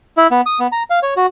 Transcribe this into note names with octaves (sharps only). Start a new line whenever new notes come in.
E4
B3
D#6
B3
A#5
F5
C#5
F#4